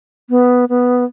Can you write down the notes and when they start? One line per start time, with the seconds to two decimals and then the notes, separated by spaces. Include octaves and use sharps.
0.30 B3
0.69 B3